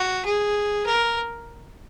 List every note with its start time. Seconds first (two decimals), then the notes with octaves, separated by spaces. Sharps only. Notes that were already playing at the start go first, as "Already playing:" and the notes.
Already playing: F#4
0.25 G#4
0.86 A#4